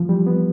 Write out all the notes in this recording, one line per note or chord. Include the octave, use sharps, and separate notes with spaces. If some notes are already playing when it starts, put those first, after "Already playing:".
Already playing: E3 F3
G3
B3